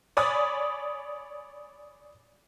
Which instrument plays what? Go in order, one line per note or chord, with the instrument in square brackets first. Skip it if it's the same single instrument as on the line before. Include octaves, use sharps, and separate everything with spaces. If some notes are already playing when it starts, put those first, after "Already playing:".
[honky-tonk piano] C#5 D5 G#5 B5 D#6